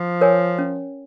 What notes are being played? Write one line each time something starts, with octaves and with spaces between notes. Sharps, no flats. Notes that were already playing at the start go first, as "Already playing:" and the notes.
Already playing: F3
A#4 C#5 G#5
C#4